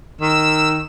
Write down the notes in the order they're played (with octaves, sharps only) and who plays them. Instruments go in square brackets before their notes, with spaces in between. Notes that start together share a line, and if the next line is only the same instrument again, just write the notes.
[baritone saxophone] D#3 [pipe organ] E6